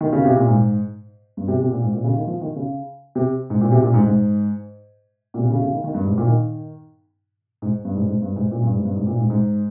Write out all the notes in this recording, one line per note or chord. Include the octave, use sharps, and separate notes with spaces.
D#3
C#3
C3
A#2
G#2
G2
C3
C3
A#2
G#2
A#2
C#3
D#3
F3
D#3
C#3
C3
G#2
A#2
C3
A#2
G#2
G#2
A#2
C3
C#3
C#3
D#3
D#3
G2
G#2
A#2
D#3
G#2
G2
G#2
G#2
G2
G#2
A#2
G2
G#2
G2
G#2
A#2
G#2
G#2